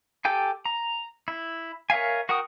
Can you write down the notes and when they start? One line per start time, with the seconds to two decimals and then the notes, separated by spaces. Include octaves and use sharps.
0.25 G4 A4 G5 G#5
0.66 A#5
1.28 E4
1.90 A#4 C#5 E5 F5 G#5
2.29 F#4 A#4 F#5 G5 D#6